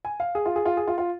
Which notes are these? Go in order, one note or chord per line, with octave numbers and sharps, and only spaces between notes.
G#5
F5
G#4
F4
G#4
F4
G#4
F4
F4